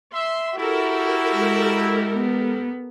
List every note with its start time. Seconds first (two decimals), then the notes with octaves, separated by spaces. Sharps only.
0.14 E5 C6
0.57 E4 F#4 G4 A4 A#4
1.32 G#3
2.15 B3